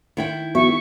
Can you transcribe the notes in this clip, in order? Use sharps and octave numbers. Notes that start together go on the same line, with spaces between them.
D#3 E4 G5
B3 F#4 E5 C#6